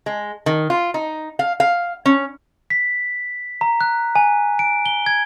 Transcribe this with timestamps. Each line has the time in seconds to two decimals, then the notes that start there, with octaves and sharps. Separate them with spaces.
0.06 G#3
0.46 D#3
0.70 F4
0.94 D#4
1.39 F5
1.60 F5
2.06 C#4
2.70 B6
3.61 A#5
3.81 F#6
4.16 G#5
4.59 D7
4.86 G7
5.06 G#6